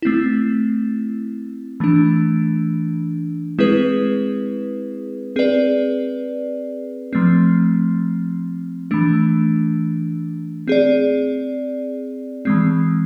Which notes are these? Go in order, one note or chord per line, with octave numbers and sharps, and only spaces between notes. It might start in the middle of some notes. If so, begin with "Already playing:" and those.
A3 C4 E4
E3 A3 D4
G#3 C4 E4 G#4 B4
C4 G#4 B4 D5
F3 A3 C4
E3 A3 D4
C4 G#4 D5
E3 G#3 C4